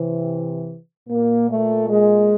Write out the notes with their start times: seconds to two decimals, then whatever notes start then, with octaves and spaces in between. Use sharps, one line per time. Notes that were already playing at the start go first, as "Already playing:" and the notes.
Already playing: C3 E3
1.08 A#2 A#3
1.49 A3
1.88 G#3